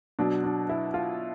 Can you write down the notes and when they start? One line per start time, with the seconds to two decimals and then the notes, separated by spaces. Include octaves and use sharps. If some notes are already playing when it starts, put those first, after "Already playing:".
0.19 B2 F#3 D4
0.44 D4
0.69 E4
0.94 F4